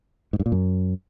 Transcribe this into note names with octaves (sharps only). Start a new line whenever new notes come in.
G#2
G2
A#2
F#2